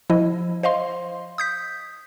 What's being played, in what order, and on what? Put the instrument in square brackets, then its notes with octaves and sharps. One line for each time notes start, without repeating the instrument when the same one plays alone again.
[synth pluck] F3 E4 D#5
C5 D#5 F5 C6
D#6 G6 B6